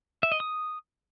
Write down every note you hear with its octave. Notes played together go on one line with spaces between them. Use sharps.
E5
D#5
D#6